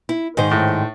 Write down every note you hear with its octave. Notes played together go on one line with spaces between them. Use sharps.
E4
G#2 D#3 C5
A2